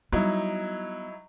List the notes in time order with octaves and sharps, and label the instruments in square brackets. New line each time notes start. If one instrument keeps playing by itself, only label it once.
[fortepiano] F#3 D#4 E4 [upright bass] G3 B3